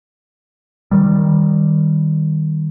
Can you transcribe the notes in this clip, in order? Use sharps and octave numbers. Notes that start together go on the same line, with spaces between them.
D#3 G3